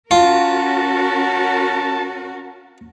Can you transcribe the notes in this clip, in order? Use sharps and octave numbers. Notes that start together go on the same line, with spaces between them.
C#4 F4 F#4 A#4 A5